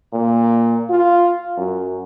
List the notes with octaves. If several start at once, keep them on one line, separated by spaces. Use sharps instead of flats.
A#2
F4
F#2